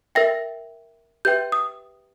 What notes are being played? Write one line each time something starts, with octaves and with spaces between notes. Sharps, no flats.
A#4 E5 G5 A#6
G4 B4 E5 G5 G6
D#6